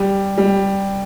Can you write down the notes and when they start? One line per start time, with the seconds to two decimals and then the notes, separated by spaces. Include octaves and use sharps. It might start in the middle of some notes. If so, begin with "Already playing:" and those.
Already playing: G3
0.38 G3